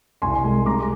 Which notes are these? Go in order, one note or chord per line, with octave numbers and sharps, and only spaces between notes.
C2 G#5 C6
G#3
C3 A#5 D6